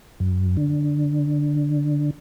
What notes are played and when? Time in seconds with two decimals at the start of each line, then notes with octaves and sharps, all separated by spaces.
0.20 F#2
0.57 D3